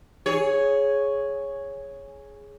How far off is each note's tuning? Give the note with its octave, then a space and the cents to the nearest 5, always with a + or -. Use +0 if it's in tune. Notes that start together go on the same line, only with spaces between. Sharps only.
G#4 +0 C#5 +0